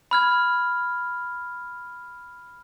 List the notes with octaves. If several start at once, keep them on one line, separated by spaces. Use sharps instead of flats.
B5 F6 G#6